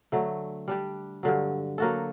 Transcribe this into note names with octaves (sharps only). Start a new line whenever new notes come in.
D3 F#3 A3
G3 D4 G4
G2 D3 F#3
F#3 A#3 F#4 A4